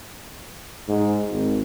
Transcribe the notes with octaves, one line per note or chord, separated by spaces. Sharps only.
G#2
G#1